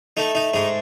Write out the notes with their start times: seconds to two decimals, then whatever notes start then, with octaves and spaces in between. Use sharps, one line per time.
0.17 A3 D#4
0.35 D#4
0.54 G#2 D#4